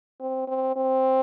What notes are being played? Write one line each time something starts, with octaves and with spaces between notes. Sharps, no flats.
C4
C4
C4